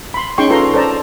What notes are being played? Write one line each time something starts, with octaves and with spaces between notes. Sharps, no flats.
B5 C6
C#4 D#4 G#4 G5 C6 C#6
F4 A4 B4 A#5 C6
A4 C5 D5 A5 A#5